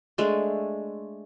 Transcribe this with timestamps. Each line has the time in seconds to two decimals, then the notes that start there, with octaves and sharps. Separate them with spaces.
0.18 G#3 A3 D4